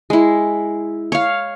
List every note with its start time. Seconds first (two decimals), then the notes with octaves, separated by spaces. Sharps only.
0.10 G#3 E4
1.12 C#5 F5